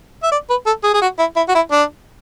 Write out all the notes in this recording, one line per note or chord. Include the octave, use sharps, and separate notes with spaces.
E5
D5
B4
A4
G#4
G#4
F#4
E4
E4
F#4
E4
D4